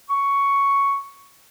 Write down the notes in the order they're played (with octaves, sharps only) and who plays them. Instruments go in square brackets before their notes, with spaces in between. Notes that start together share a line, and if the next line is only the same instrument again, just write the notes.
[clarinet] C#6